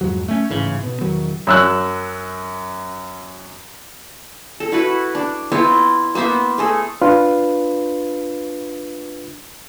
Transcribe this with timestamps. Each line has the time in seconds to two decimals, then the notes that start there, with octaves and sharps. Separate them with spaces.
0.01 F2 G#2 F#3
0.28 A3 C#4
0.50 A1 G#2 C#3 E3
0.83 B2
1.01 E1 D#3 F#3
1.47 F#2 E6 F#6
4.60 A4
4.72 E4 F#4 B4
5.15 D4
5.52 B3 C4 E4 F4
6.15 A#3 B3 C5 E5
6.58 A3 G#4 A4
7.02 D4 F4 B4